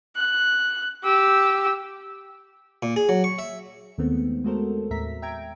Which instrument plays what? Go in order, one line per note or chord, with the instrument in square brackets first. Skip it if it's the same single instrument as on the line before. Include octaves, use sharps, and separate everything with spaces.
[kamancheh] F#6
G4 E6
[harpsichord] A#2
G#4
F#3
C#6
E5
[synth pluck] D#2 D#3 G#3 A3 B3 C4
G#3 A3 F#4 A4 A#4 C5
D#2 A2 E5 A#5 B6
E5 G5 A#5 G#6 D7